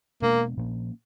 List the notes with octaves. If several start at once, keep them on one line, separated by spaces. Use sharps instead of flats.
B2 G#3 A#3 B3 D4
A#2 F3 A#3 C#4